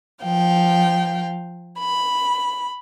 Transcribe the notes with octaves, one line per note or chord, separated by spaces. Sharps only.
F3 F5 G5
B5